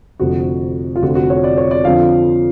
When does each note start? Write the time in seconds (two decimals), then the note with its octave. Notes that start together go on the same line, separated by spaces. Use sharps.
0.19 F1 F2 D3 F#4
0.96 F4
1.02 F1 F2 D3 F3 F#4
1.15 F#4
1.30 C#5
1.44 D5
1.58 C#5
1.71 D5
1.84 F2 D3 F3 F5